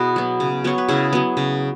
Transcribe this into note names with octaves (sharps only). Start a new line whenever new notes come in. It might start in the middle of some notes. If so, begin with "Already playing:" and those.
Already playing: B2 E4 F#4 G#4 B4
F#3 B3
C#3
F#3 B3 C#5
B4
C#3 E4 G#4
F#3 B3
C#3